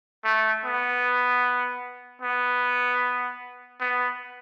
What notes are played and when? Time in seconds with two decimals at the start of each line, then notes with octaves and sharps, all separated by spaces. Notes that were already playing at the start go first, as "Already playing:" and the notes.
0.24 A3
0.65 B3
2.22 B3
3.80 B3